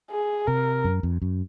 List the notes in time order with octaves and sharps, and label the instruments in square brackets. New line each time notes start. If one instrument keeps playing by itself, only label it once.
[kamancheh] G#4
[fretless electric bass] C3 [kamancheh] A#4
[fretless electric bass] F#2
F2
F#2